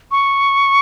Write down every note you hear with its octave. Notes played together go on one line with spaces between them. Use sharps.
C#6